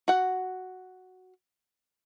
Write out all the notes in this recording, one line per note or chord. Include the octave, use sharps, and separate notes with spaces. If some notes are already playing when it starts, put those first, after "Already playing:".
F#4 F#5